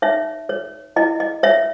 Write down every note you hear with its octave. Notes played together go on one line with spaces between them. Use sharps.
D#4 C#5 E5
C#5
E4 D#5
D#5
C#5 E5